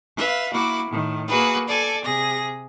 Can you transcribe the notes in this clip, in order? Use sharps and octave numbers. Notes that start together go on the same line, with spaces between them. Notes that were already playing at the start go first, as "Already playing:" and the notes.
B4 E5 F5
A#3 E4 F#4 D6
A2 D#3
A#3 F#4 G#4 B4
A4 D5 G#5
C3 G#4 A#6